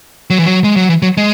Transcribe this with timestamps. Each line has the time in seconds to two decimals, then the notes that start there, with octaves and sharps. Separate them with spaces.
0.30 F#3
0.38 E3
0.46 F#3
0.64 G#3
0.76 F#3
0.89 E3
1.02 F#3
1.17 G#3